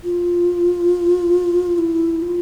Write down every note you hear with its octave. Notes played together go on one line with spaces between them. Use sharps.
F4
E4
F4